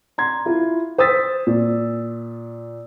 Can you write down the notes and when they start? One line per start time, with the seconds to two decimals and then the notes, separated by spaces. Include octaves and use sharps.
0.18 A#5 C6 G#6
0.46 E4 F4
0.98 C5 D#6 E6 A6 B6
1.47 A#2